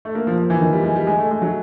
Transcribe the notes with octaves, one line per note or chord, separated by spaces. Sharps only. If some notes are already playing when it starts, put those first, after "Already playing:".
A3
A#3
F3
F3
E3
D#3
G3
G#3
G3
G#3
A3
G#3
F#3